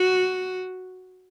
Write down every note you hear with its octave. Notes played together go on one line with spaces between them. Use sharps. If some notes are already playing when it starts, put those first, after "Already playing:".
Already playing: F#4